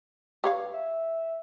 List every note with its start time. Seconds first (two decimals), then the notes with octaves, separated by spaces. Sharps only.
0.44 G2 G4 C#5 F5
0.74 E5